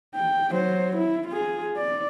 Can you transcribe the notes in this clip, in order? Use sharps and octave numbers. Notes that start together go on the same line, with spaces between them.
G5
F#3 C5
E4
F4 G#4
D5